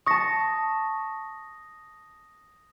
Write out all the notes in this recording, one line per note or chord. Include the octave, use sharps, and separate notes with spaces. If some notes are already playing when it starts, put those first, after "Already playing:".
A5 C#6 D#6 A#6